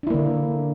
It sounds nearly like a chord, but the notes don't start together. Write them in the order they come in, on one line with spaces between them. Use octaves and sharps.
D4 E4 A#3 D3